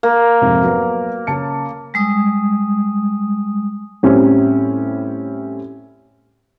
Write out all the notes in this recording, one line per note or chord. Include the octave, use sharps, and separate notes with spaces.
A#3
F2 G#2 C3
F#3 B3
C#3 A5 C#7
G3 G#3 D#6
A2 G3 C4 C#4